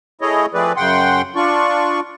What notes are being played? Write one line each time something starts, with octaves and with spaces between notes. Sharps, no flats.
A3 E4 G#4 C#5 D#5
F3 A3 C4 G#4 B4 D5
F#2 C#3 F#5 G5 C6
D4 F4 D5 C#6